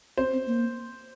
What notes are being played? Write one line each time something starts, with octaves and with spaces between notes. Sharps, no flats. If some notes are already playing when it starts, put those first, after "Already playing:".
C4 C5
C4
A#3